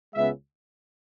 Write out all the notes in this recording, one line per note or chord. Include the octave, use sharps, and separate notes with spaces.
C#2 C#3 G#3 B3 E5